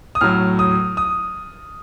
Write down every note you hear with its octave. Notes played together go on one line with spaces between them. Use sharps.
D#6
A2 F#3 F6
D#6
D#6